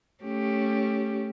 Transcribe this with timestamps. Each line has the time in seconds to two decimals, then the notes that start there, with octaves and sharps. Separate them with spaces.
0.24 A3 C#4 G4